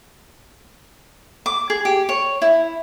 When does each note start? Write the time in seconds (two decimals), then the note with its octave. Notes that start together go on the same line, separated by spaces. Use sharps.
1.46 D6
1.70 G#4
1.85 G4
2.09 C#5
2.42 E4